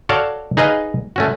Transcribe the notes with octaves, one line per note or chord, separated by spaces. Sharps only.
F#4 A4 C#5 D5 F5
D#4 G#4 B4 D#5 F5
A3 C#4 F#4